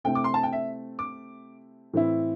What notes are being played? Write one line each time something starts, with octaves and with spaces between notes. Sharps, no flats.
C3 A3 C4 E4 G5
D6
C6
A5
G5
E5
D6
A2 E3 C4 E4